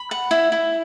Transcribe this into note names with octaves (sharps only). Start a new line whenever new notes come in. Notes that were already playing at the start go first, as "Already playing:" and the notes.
Already playing: B5
F#5
E4
E4